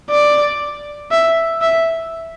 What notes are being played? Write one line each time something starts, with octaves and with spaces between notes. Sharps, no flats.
D5
E5
E5